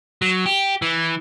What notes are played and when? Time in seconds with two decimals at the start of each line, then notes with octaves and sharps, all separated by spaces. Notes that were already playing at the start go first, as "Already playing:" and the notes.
0.22 F#3
0.46 G4
0.82 E3